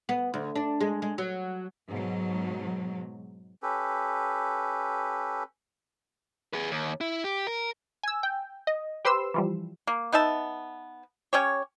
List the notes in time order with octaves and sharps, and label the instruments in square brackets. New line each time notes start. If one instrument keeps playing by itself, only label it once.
[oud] B3
D2
D4
G#3
G#3
F#3
[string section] G#2 B2 F#3
[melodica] C#4 G4 A4 B4
[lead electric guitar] G#4 B4
D#2
E4
G4
A#4
[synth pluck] G#5 E6
G5
D#5
G4 B4 C5 C6 E6
E3 F3 G3
[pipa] A#3
B3 D#4 E5 A5
C#4 G4 C#5